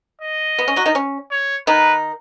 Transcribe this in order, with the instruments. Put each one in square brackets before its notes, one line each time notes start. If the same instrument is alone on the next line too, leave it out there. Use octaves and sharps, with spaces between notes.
[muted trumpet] D#5
[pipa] B3
C#4
F#3 F#4
D#3 D#4
C#4
[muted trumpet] C#5
[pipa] D#3 D#4 [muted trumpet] B4